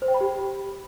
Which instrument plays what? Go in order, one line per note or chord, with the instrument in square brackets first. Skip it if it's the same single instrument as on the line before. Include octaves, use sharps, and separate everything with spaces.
[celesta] C5
G5
B5
G4